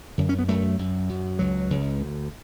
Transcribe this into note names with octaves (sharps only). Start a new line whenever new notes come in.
F#2 D3
C#4
B3
F#2 A3
F#2
F#2
C#2 F#3
C#2
D2